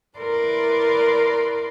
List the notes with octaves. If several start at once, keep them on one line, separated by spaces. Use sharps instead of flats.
E4 A#4 B4 D5 C6